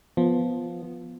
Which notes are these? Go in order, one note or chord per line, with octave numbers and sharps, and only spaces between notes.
F3 B3